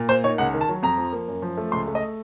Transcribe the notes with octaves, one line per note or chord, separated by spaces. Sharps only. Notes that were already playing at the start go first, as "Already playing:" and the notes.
Already playing: A#2
A#3 C5
D#4 C#5
C#2 F#5
D#3
A5
F#3
F2 A#5
F3
A#3
F#2
F3
A3
C#2 C6
A3
D#5